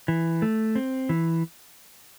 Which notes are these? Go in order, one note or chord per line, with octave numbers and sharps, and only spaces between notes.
E3
A3
C4
E3